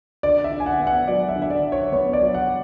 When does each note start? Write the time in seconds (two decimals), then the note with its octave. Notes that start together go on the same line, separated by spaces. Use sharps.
0.23 D3 D5
0.44 E5
0.52 D3
0.60 G#5
0.66 F#5
0.80 B3
0.87 F#5
1.08 F#3 D5
1.29 E5
1.36 D3
1.42 E5
1.50 D5
1.64 D3
1.72 C#5
1.92 B3 C#5
2.13 D5
2.21 F#3
2.34 F#5